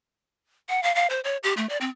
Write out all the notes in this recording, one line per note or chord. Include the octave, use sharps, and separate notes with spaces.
F#5
F5
F5
C5
C#5
G4
A3
D5
C4